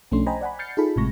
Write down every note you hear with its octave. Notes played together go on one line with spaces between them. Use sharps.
B1 F3 A3 C#4 D4 C6
C5 D#5 G5 G#5 A#5 B5
D5 F#5 G#5 B5
F6 G6 A6 C7 C#7
D#4 F4 G#4 A4 A5 B5
G#1 A2 C3 G#3 C#6 A#6